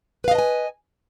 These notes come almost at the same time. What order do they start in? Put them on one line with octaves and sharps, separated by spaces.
B4 F5 D#5 A5 G#5